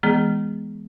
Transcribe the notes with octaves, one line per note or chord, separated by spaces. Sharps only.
E3 G#3 B3 G#4